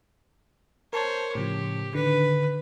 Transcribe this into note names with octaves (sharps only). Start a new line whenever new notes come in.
A#4 C5 C#5 A5
A2 C#3 F3 G4
D3 D#3 B4